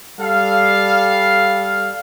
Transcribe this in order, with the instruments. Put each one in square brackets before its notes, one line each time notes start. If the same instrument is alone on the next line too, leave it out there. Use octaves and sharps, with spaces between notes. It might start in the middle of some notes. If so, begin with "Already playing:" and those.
[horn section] G3 A4 F5